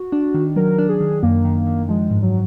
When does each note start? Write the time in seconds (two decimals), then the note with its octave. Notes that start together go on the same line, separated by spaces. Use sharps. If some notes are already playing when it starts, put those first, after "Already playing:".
Already playing: F#4
0.12 D4
0.34 D#3
0.56 F#3 A#4
0.78 D4
0.89 G#4
1.01 D#3
1.23 F#2 A#3
1.45 D#3
1.67 D#3
1.89 F3 G#3
2.11 G#2
2.22 F#3